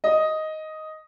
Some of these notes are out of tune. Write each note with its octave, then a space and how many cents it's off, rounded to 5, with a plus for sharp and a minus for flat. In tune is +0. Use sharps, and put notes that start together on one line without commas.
D#5 +5